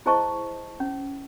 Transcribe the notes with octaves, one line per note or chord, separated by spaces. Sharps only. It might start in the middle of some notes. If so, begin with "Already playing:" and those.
E4 G#4 C5 D#5 A5 C#6
C#4